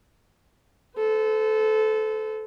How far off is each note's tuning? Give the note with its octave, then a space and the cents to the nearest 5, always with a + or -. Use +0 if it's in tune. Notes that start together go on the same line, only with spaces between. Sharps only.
A4 -20 C5 -45